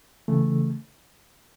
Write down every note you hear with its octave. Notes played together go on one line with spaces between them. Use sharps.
C#3 E3 A3